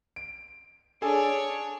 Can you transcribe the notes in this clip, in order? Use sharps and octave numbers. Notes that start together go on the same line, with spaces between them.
D7
D4 G#4 A4 C#5 G#5